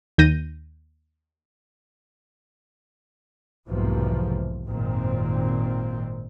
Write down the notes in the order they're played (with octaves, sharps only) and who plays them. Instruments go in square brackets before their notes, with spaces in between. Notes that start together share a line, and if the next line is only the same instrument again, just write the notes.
[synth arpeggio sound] D#2 G6 A#6 D#7
[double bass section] B1 E2 G#2 C3 F3 A#3
G#1 F#2 A#2 D#3 C4